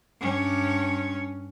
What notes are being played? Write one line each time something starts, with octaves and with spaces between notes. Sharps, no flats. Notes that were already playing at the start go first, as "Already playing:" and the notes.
G2 C#4